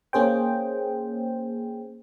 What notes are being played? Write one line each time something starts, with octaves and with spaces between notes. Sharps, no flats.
A#3 C#4 G#4 C5 G5